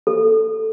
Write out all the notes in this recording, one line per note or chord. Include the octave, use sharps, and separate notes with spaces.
A4